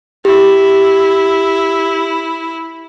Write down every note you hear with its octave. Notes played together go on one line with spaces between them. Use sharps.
E4 G4